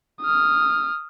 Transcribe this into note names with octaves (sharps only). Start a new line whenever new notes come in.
D#6 F6